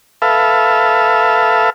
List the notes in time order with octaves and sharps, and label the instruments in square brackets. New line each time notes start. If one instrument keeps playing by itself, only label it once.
[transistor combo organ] A4 B4 E5 F5